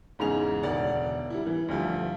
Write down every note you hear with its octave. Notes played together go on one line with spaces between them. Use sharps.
E2 G#2 C#3 D#4 G#4 F7
E1 D2 D5 F#5
G3 E4
E3
D2 G2 F3 A3